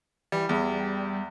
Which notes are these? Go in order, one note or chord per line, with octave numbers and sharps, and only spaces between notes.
E3 G3
E2 G3